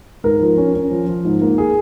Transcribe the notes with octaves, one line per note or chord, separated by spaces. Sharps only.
G#2 A#4
F3
C#4
C#4
F3
F3
G#2
A#3
G#4